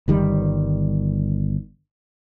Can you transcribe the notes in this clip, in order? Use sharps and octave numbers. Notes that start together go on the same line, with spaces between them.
G1 D#3 G3